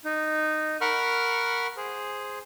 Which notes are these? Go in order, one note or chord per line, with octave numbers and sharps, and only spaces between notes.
D#4
A#4 F#5 B5 C#6 F6
G#4 C5